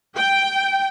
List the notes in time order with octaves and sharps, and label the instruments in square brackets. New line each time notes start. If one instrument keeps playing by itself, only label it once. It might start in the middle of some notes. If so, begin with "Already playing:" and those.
[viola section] G5